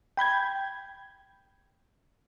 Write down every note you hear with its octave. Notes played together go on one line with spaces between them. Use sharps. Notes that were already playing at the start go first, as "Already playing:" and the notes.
G5 B5 G6 G#6